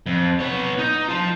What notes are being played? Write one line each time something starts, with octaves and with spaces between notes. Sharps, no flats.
F2
B3 C#5
D#4
F4 A5